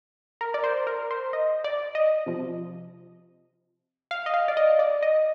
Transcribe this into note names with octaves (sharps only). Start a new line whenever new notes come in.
A#4
D5
C5
A#4
C5
D#5
D5
D#5
C3 F3
F5
D#5
F5
D5
D#5
D5
D#5